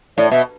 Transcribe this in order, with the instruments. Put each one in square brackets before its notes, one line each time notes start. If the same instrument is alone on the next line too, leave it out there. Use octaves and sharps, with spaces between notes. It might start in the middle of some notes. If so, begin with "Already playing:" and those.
[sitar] A2 [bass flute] D5
[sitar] B2 [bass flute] E5